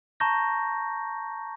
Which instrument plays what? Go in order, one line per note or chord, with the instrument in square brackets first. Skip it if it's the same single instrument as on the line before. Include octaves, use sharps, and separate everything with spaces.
[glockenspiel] A5 A#5 C#6 G6 A#6